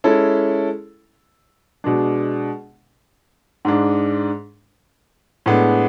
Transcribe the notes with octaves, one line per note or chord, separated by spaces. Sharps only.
G#3 C#4 E4 A4
B2 G#3 D4
G#2 G#3 D4
A2 G#3 B3 D4